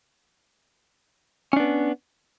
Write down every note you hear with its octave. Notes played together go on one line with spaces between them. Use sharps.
B3 C#4 D4